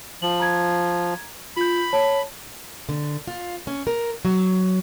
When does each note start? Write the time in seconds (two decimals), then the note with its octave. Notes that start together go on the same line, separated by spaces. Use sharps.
0.22 F3 F#7
0.40 A#5 G#6
1.57 F4 B5 G6
1.93 C#5 A5
2.89 D3
3.27 F4
3.67 C#4
3.87 A#4
4.25 F#3